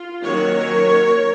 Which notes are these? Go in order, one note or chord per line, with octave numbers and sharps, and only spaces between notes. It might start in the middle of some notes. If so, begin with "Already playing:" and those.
Already playing: F4
D#3 F#3 A#3 C#4 A#4 C#5